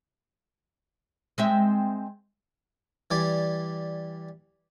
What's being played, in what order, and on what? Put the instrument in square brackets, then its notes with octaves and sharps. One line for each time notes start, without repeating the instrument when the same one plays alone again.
[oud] G#3 C4 E5
[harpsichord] E3 G3 D5 G#5